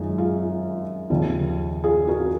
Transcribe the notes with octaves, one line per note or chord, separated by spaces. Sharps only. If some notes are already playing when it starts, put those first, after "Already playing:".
Already playing: F#2 D#3 G#3 F4 G#4
F4 G#4
D#2 C#3 F3
F4 G#4
F#4 A#4